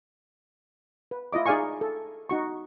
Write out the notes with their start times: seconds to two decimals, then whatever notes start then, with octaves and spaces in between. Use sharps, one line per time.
1.11 B4
1.33 E4 F4 D#5 D6
1.46 D#4 G#4 D5 F5 G#5 C#6
1.81 A4
2.29 D#4 F#4 C#6